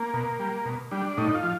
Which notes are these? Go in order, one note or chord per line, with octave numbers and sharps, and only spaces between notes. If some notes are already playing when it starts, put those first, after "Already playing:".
Already playing: A#3
B2
G3
B2
G3 D4
A2 D#4
F4
F3